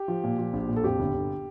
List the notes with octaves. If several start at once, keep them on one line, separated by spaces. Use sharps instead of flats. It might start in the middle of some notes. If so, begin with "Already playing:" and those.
Already playing: G4
F3
A#2
F3
A#1
A#2
A4
F2 G4
G1
G1